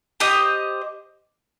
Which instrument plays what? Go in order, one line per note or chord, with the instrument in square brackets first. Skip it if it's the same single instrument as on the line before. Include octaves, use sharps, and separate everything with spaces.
[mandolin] G4 C5 D#5